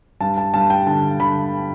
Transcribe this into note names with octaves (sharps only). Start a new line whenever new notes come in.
G2 A5
A5
G2 A5
G5
D3 A5
D3 B5